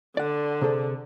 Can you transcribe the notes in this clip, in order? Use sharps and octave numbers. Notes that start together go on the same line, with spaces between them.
D3 D5 F#5
C3 G#4 A4